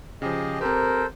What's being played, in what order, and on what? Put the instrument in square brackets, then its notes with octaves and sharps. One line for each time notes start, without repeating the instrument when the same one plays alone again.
[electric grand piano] C#3 F3 [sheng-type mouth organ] G4 G#4 D#5
[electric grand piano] C4 G4 [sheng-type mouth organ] A4 C5 [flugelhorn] A#4